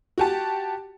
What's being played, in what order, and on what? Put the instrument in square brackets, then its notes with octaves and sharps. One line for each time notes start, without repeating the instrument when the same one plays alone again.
[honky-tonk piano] F#4 G4 A5